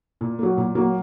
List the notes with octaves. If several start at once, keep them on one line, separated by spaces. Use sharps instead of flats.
A#2
F#3 A#3
A#2
F#3 A#3